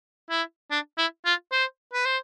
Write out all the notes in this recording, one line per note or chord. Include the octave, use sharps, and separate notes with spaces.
E4
D4
E4
F4
C5
B4
C5